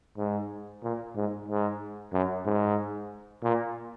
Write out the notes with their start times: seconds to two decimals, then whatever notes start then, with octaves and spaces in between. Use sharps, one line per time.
0.18 G#2
0.83 A#2
1.16 G#2
1.48 G#2
2.13 F#2
2.46 G#2
3.43 A#2